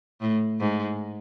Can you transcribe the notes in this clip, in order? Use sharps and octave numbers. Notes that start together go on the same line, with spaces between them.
A2
G#2